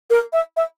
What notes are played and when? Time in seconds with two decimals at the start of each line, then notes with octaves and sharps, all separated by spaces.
0.10 A#4
0.33 E5
0.57 E5